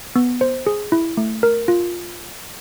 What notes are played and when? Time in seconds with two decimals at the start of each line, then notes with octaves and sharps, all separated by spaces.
0.15 B3
0.41 C5
0.67 G#4
0.92 E4
1.17 A3
1.43 A#4
1.68 F4